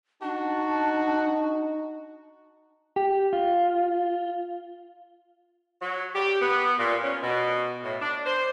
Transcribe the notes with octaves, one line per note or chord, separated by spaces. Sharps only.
D4 D#4 F#4 A5
G4
F4
F#3
G4
B3
A#2
C#4
B2
A2
D4
C5